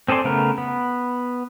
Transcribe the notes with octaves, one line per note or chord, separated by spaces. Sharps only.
C4 G#4 A4 D5 C6
C#3 A3 B3 A#4
B3